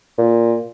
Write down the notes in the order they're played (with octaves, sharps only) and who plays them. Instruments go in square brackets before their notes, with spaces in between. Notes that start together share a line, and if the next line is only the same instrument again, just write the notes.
[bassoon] A#2